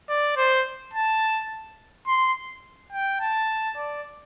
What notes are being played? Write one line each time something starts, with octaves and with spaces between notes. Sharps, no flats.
D5
C5
A5
C6
G5
A5
D5